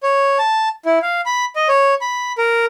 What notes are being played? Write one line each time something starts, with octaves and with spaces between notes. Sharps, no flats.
C#5
A5
E4
F5
B5
D#5
C#5
B5
A#4